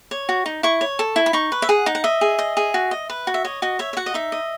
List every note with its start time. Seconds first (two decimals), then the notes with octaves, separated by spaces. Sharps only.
0.11 C#5
0.29 F#4
0.46 D#4
0.63 E4 C#6
0.81 C#5
0.99 A4
1.16 E4
1.26 B5
1.33 D#4 C#6
1.52 B4
1.62 E5
1.69 G#4 F#5
1.86 D#4
1.95 F#5
2.04 D#5 E5
2.21 G#4
2.39 D#5
2.57 G#4
2.74 F#4
2.91 D#5
3.10 B4
3.27 F#4
3.34 E5
3.45 C#5 D#5
3.62 F#4 D#5
3.79 C#5 E5
3.93 E5
3.97 F#4 F#5
4.06 D#5
4.14 D#4 E5
4.32 D#5